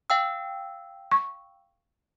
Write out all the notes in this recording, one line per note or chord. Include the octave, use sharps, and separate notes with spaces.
F5 G5 E6
C#6